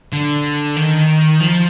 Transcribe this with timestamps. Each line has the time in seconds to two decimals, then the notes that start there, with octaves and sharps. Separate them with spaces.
0.13 D3
0.76 D#3
1.40 F3